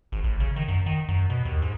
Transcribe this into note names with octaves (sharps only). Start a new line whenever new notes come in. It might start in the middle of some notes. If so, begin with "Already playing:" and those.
G#1
A1
C#3
D#3
F#2
D#3
F#2
B2
D#2
G#2